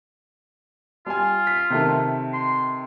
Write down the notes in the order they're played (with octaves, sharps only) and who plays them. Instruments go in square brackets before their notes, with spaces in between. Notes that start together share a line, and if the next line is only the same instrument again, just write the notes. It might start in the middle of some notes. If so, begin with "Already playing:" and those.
[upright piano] G3 G#5 [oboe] F4
[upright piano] B6
C3 D#3 A3
[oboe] C6